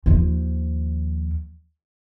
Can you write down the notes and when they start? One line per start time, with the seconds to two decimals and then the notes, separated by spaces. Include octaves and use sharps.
0.06 D#2 F3